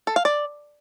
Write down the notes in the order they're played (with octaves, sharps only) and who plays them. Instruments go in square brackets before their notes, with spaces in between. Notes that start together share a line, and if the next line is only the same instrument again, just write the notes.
[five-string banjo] A4
F5
D5